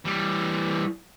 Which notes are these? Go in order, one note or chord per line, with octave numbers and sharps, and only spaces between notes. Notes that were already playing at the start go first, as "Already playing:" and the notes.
E3 G3